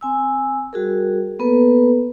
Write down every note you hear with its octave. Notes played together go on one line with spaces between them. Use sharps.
C4 G#5 E6
G3 F#4 G#4 A#4
A#3 B3 A4 B4